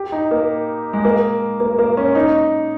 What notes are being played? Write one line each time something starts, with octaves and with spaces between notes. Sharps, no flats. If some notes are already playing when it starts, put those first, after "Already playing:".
Already playing: G4
D#4
A#3
G#3
A#3
A#3
A#3
C#4
D#4